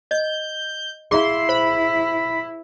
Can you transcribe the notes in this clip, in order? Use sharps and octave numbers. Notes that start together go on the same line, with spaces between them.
D#5 G6
E4 G#4 F5 C6
C5 B5